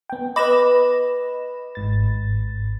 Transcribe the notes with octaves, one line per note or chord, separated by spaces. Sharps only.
B3 G5
B4 D#5 B5 D6 A#6 E7
G#1 G#2 A6